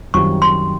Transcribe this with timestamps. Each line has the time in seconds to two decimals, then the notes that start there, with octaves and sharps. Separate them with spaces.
0.14 F#2 D#3 G3 C4 F4 C#6
0.42 C6